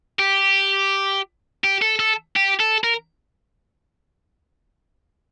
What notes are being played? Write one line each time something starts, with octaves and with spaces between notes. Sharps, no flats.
G4
G4
A4
A4
G4
A4
A#4